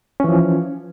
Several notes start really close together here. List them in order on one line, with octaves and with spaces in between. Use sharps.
C#4 E3 F3